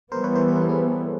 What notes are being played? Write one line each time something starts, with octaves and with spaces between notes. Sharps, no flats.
E3 G3 B3 A#4 C5
B4 C#5
A#4 C5
B4
A#4
A4
G#4 A#4